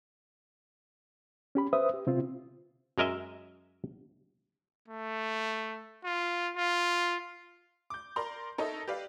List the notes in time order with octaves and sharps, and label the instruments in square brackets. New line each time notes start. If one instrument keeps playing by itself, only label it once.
[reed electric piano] C#4 G4 B5
B4 C5 E5 D#6
G4
C3 C4 F4
[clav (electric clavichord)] F#2 G#3 A#4 D#5 E5
[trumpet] A3
F4
F4
[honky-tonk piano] D6 G6
A#4 D5 A#5 C6
D#4 A4 A#4 C#5 D#5 E5
G4 B4 D5 F5